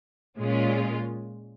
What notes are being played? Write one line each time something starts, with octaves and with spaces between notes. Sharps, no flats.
A#2 G#3 C#4 F4